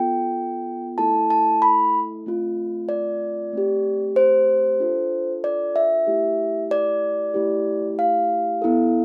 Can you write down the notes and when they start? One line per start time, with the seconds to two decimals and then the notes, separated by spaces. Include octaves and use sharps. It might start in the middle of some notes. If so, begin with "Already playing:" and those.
Already playing: B3 F4 A4 G5
0.98 A3 E4 A4 A5
1.30 A5
1.62 B5
2.26 A3 C4 F4
2.89 D5
3.53 A3 C4 G4
4.16 C5
4.80 D4 F4 A4
5.44 D5
5.76 E5
6.07 A3 E4 G4
6.71 D5
7.34 A3 E4 G4
7.99 F5
8.62 B3 E4 A4